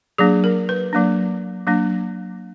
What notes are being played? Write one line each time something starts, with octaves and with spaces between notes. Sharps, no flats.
F#3 A#3 D4 G#4
A#4
B4
F#3 A#3 D4
F#3 A#3 D4